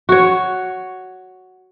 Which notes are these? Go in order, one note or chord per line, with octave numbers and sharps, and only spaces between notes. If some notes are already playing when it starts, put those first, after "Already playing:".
F#4 C#5